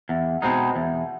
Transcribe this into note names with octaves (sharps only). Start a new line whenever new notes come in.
E2
B2 G#3 C4 D#4
E2